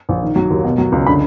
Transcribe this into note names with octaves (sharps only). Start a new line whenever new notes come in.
A#1
D#3
F#3
D#2
B2
F#3
C#2
D3 B5